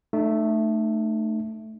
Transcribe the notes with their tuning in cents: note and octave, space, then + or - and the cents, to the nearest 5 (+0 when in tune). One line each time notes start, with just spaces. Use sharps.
A3 +0 D#4 -40